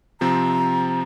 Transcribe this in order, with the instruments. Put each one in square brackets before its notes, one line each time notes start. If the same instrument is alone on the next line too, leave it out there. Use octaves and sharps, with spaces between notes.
[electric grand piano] C3 F3 C4 [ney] A#5